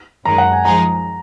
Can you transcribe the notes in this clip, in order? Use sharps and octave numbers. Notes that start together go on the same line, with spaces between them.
F#2 D#3 G#3 A#5
F#5
G#5
F3 G#3 D#4 G#4 A#5